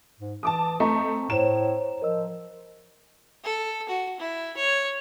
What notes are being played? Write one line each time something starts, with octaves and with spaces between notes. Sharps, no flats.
G#2
E3 A5 D6 D#6
A3 C4 D#5 A5 A#5 C#6
A2 C5 C#5 A#5 E7
F3 A#4 D#5 E6
A4
F#4
E4
C#5